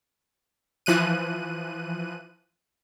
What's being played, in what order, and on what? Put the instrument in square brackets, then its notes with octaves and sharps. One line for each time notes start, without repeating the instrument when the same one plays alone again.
[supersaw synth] E3 F3 F#6 D#7